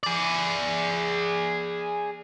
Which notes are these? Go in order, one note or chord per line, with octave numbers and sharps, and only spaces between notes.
G#4 D5